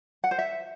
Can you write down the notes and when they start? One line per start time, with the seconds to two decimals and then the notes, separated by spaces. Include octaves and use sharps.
0.24 F#5
0.31 C5
0.39 E5